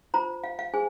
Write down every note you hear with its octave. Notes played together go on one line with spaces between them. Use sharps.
F4 C5 A#5
F5
F5
G#4 C5 G#5